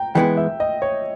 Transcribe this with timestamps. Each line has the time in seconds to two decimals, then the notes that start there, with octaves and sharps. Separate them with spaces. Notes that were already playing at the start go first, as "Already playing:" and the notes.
Already playing: G5 A#5
0.15 E3 G#3 B3 E4 G5
0.37 E5
0.60 D#5
0.82 C#5